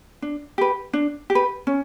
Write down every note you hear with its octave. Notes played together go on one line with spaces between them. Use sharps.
D4
G4 B4
D4
G4
B4
C#4